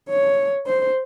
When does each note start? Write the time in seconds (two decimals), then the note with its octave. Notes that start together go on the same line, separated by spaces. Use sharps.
0.09 C#5
0.67 C5